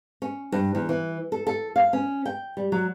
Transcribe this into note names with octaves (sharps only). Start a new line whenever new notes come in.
C#4
G2
E2
E3
A4
A4
F5
C#4
G5
G3
F#3